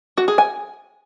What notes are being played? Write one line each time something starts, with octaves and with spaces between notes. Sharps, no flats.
F#4
G#4
G#5